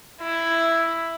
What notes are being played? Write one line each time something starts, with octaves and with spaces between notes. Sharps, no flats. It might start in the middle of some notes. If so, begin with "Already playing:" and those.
E4